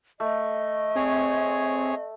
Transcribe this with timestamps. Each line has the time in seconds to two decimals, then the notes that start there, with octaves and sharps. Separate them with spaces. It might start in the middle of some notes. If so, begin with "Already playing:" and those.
0.20 A3 D#5
0.96 C4 G#4 C#5